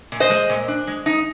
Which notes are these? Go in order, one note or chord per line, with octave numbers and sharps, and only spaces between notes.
A#2
C5 D#5
G#3
A#2
D4
G#3
D#4